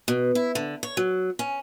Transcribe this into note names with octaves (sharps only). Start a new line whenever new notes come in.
B2
E4
D3
C#5
F#3
C#4